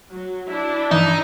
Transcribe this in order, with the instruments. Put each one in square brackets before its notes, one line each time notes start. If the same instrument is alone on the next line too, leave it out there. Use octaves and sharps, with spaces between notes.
[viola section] F#3
D4 E4
[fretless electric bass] G2 E3 F3 [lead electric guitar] D#4